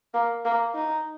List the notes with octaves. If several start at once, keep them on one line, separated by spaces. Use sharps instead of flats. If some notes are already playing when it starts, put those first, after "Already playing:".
A#3
A#3
D#4